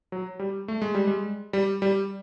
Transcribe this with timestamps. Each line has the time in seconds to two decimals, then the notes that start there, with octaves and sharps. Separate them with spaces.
0.12 F#3
0.39 G3
0.68 A3
0.82 G#3
0.95 G3
1.07 G#3
1.53 G3
1.82 G3